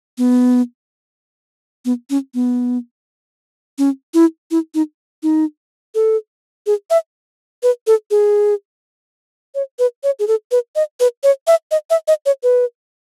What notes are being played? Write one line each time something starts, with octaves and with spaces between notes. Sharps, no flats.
B3
B3
C#4
B3
C#4
E4
E4
D#4
D#4
A4
G#4
E5
B4
A4
G#4
C#5
B4
C#5
G#4
A4
B4
D#5
B4
C#5
E5
D#5
E5
D#5
C#5
B4